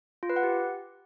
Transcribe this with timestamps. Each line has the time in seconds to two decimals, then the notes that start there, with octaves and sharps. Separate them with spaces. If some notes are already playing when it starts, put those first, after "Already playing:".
0.23 F4
0.30 B4
0.36 F#5
0.43 G4